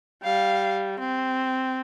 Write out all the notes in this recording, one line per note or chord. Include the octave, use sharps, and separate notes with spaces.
G3 F5
C4